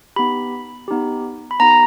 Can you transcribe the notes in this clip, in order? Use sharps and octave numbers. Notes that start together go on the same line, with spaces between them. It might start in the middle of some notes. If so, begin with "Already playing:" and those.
B3 D#4 G4 B5
B3 D#4 G4
B5
B3 D#4 G4 A#5